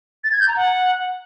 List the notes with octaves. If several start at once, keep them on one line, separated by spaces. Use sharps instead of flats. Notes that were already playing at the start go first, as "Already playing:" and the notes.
A6
G#6
G6
A#5
F#5